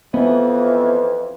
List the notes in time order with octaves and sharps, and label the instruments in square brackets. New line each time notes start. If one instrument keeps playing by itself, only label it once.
[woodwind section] F2 E3 [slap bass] B3